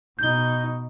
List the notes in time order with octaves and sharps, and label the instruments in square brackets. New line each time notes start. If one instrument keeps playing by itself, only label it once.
[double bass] B2 D#4 [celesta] G6 G7